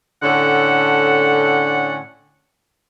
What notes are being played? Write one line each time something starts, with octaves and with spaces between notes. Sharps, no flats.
A2 D3 C#4 A4 F#5